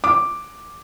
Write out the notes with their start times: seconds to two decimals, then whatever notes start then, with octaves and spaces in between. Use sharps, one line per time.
0.04 D6